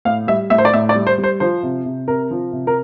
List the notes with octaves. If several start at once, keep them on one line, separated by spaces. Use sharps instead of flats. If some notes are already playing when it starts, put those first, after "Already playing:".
A2 F5
G3 E5
A2 E5
C5
D5
A2 E5
D5
G3
C5
G3
C5
F3 C5
C3
C3
C3 A#4
F3
C3
A#4